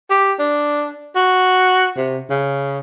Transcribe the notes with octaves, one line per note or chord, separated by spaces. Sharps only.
G4
D4
F#4
C3
C#3